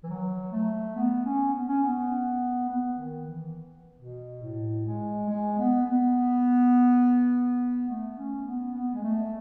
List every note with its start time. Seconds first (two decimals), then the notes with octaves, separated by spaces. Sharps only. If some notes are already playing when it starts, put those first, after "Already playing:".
0.03 E3
0.10 F#3
0.52 A3
0.96 B3
1.25 C#4
1.53 B3
1.68 C#4
1.82 B3
2.69 B3
2.98 D#3
3.27 E3
3.99 B2
4.42 A2
4.86 G#3
5.29 G#3
5.58 B3
5.86 B3
7.88 A3
8.17 C#4
8.46 B3
8.74 B3
8.94 G#3
9.04 A3